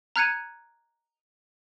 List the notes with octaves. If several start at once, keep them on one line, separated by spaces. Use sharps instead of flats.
A#5 F6 F#6 G#6 C#7 D#7